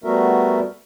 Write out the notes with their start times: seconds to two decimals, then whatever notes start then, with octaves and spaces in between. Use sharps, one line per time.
0.04 G3 A3 B3 F#4 A#4 E5